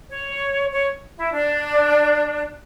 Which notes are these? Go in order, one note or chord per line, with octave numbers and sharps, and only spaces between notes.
C#5
C#5
E4
D4